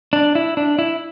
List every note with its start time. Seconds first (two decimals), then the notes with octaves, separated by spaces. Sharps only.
0.13 D4
0.35 E4
0.57 D4
0.79 E4